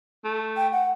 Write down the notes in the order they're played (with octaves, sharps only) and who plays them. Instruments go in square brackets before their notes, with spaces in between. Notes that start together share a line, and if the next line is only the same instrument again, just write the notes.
[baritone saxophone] A3
[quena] G5
F#5